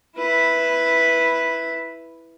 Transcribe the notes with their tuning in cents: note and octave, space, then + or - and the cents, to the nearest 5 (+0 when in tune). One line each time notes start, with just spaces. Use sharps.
E4 +0 B4 +0